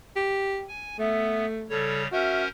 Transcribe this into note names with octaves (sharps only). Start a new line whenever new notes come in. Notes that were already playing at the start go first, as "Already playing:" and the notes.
G4
G#5
A3 B3 E5
C#3 G3 A4 C#5
C#4 F#4 A#4 C5 E5